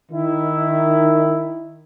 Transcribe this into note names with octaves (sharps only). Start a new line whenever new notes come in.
D#3 E4